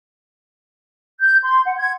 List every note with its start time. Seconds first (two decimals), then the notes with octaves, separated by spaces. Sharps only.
1.20 G6
1.44 C6
1.66 F#5
1.78 G#6